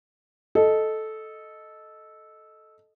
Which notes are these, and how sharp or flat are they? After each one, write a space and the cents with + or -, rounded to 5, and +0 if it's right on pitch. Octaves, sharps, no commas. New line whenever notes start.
A4 -10 D#5 +0